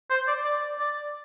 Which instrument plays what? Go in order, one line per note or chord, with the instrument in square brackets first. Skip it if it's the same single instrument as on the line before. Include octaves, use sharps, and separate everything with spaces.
[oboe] C5
D5
D5
D5